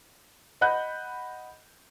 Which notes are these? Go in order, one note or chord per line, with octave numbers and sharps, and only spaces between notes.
D#5 F#5 B5 F#6 G6